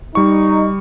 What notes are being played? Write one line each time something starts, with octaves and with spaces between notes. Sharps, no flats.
G3 D#4 C#6